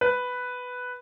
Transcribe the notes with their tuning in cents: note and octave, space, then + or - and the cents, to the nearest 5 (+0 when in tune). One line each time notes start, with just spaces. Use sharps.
B4 +5